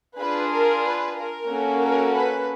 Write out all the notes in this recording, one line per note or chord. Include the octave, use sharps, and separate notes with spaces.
D4 F4 G#4 B4
A#4
B4
A#4
A#3 C#4 F#4 A4
A#4
B4